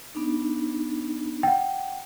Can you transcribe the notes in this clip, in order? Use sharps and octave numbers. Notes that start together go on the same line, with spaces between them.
B3 D4 D#4
F#5 G5